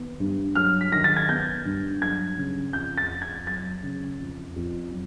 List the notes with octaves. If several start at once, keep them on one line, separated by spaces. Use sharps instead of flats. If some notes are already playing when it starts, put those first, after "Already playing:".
Already playing: D#3 B3
G2
F#3 F6
B6
D#3 A#6
A6
G#6
B3 G6
G2
F#3 G#6
C#3
F2 G6
A6
F2
G#6
F#3 A6
C#3
F2
F2
F#3